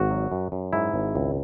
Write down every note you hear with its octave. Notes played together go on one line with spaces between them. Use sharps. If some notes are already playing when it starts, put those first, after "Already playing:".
Already playing: G#1 F#4
F#3
F#2
F#2
G#2 E4
G#1
C#2